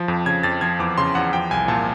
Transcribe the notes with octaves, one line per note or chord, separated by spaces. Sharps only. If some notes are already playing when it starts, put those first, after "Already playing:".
Already playing: F3
F2
C#3 G#6
F2 A6
F3 G#6
E2 D6
C#3 C6
E2 F#5
F3 G5
C2 G#5
A#2 A5